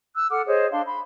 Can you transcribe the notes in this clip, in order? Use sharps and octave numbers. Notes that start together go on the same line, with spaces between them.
E6 F#6
A4 F#5 D6 F6
G#4 C5 C#5 D#5
D4 F5 C6
B5 C6